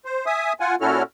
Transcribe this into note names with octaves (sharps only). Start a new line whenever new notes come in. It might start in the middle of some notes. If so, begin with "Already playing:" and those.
C5
E5 G#5 D#6
F4 F#5 G#5
A#2 C#4 E4 F#4 A4 F6